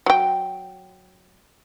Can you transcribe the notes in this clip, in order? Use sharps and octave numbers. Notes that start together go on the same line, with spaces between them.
F#3 G5